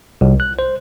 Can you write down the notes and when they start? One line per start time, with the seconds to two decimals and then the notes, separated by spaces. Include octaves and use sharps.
0.21 C2
0.40 F#6
0.59 C5